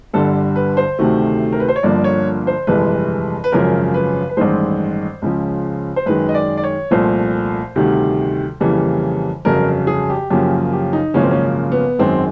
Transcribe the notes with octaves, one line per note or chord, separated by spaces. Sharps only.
G1 G2 D3 G3 A4
B4
C5
D2 C3 D#3 F#3 A3
A#4
B4
C5
C#5
G1 G2 D3 F3 A#3 D5
C#5
C5
G1 F2 C3 E3 G#3 B4
B4
G#1 F#2 C#3 F3 A#4
B4
B4
A1 G2 D#3 G#3 C5
C#2 C#3 F3
C5
F#2 D#3 G#3 B4
D#5
D5
D5
C#5
C2 A#2 F3 A3 C5
D2 C3 D#3 G3
F2 C#3 E3 G3 A#3
G1 F2 C#3 F#3 A#4
G#4
G4
F#2 C#3 F3 A#3 G4
G4
D#4
G#1 F#2 C#3 F3 A#3 C#4
C4
C#4
B3
G#1 F#2 D#3 G#3 C4